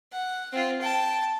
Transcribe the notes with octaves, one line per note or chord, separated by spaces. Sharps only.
F#5
C4 F4
G5 A5